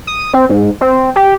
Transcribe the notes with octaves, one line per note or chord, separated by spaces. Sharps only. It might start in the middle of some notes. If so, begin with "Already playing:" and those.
D#6
C4
G#2
C4
G4